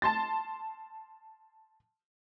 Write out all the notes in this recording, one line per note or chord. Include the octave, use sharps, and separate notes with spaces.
A5 C6 A6